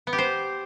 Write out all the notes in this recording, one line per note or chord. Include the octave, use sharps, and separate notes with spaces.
B3
G4
C5